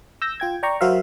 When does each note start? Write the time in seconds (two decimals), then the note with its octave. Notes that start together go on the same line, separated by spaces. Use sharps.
0.22 E6 G6 A#6
0.40 F4 G5 G#6
0.63 D5 G5 A#5 C#6
0.81 F#3 F#4 A#4 C5 E5 F5